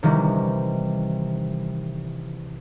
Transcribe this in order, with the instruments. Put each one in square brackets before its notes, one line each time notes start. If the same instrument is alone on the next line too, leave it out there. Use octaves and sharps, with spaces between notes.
[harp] C3 D#3 E3 G3